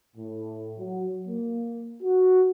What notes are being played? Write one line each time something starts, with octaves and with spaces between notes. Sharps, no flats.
A2
F#3
A#3
F#4